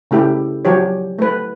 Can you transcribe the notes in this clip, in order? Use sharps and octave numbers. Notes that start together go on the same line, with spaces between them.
C#3 A3 E4 G4
F3 F#3 G4 C#5
A3 B4